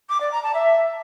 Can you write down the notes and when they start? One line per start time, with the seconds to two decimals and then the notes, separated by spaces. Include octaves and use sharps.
0.09 D6
0.20 D5
0.31 A#5
0.43 A5
0.54 E5